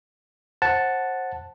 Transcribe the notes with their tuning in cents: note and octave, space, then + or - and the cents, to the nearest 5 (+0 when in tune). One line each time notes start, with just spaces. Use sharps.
C5 +25 F#5 +0 A5 +0